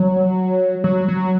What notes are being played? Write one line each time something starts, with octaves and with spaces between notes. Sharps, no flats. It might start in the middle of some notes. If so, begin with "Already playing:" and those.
Already playing: F#3
F#3
F#3